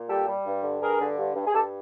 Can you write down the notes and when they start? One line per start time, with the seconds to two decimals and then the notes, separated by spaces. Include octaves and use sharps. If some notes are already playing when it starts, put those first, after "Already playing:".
Already playing: A#2
0.09 G3 G4 A4
0.27 G3
0.45 G2
0.63 D3
0.81 G2 G#4 A#4
1.00 D3
1.18 G2
1.35 G2
1.47 G#4
1.54 G2 G4 A4